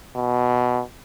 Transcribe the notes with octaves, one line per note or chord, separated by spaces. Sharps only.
B2